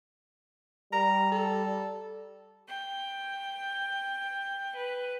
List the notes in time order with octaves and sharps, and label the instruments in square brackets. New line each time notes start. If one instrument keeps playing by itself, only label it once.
[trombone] G3 [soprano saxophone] A#5
[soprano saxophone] A4
[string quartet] G5
B4